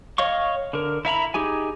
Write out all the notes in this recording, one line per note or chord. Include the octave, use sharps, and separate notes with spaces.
C#5 D#5 F5 C#6
D3 A#4
E4 E5 A#5 B5
D#4 G4 G#4 G#5